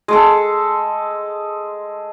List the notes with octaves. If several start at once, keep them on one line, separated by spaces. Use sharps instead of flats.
G#3 A4